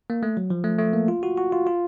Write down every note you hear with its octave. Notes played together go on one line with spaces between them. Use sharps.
A#3
A3
F#3
F3
A3
A3
A#3
F4
F#4
F#4
F4
F4